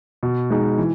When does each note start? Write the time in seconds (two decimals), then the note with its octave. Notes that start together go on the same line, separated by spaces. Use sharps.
0.23 B2
0.51 G#3 D#4
0.78 E3